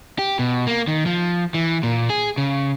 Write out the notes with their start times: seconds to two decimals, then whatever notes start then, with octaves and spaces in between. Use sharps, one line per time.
0.19 G4
0.39 B2
0.67 A#3
0.88 D#3
1.06 F3
1.54 E3
1.83 A#2
2.10 G#4
2.38 C#3